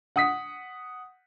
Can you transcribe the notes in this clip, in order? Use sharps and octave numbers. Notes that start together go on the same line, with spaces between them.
F#5 D#6 B6